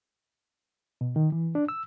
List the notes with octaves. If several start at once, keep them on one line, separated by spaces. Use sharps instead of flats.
B2
D#3
E3
D4
E6